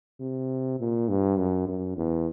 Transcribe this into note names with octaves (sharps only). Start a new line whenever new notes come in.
C3
A#2
G2
F#2
F#2
E2